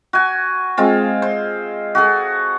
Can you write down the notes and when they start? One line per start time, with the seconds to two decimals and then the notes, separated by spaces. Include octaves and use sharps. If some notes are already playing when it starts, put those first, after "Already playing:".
0.13 F#4 G#5
0.77 G#3 C4 F4
1.22 C5
1.95 F#4 G#4 A4